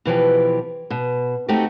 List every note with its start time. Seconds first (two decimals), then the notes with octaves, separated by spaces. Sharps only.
0.05 B2 E3 F3 G4
0.90 B2
1.48 A3 C4 D#4 F#4 G4